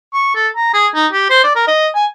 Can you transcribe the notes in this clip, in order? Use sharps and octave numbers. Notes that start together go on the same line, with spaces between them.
C#6
A4
A#5
G#4
D#4
G4
C5
D5
A#4
D#5
G#5